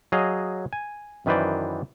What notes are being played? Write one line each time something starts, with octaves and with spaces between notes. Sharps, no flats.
F#3 G#4 D#5 F5
G#5
F#2 D#3 E3 B4 C5 D5